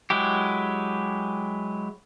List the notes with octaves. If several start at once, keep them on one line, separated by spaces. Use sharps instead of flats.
F#3 G#3 E4 G4